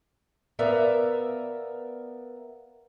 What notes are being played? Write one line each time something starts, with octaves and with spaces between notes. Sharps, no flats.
B3 A#4 D5 E5 F5